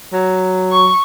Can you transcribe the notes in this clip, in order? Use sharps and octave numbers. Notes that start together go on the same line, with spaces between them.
F#3
C#6